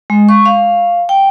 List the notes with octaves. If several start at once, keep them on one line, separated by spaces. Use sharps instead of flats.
G#3
C#6
F5
G5